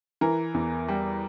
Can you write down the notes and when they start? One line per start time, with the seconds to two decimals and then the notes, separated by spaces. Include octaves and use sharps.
0.21 E3 A#4
0.54 E2
0.88 G3